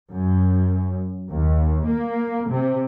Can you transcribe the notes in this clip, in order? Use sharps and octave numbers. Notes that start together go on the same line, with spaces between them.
F#2
D#2
A#3
C3